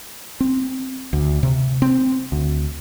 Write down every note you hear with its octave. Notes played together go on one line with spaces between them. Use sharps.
C4
D2
C3
C4
D2